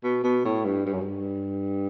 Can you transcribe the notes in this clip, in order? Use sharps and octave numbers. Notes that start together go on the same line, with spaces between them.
B2
B2
A2
G2
G2
F#2
G2